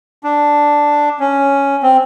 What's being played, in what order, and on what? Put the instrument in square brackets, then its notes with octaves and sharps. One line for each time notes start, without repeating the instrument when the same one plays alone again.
[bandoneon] D4
C#4
C4